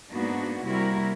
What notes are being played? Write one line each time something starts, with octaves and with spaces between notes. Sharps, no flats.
G#2 A#3 B3 D4 D#4 F#4
C3 G3 A#3 E4 F#4 A#4